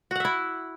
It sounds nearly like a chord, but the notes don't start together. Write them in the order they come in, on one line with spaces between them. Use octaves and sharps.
F#4 F#5 E5 E4